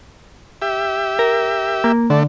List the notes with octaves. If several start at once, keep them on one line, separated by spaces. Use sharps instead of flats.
G4 E5
A#4
A#3
D3 A3 D4